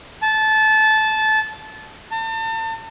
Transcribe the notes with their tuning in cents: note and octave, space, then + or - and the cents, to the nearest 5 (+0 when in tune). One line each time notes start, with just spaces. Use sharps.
A5 -20
A5 +35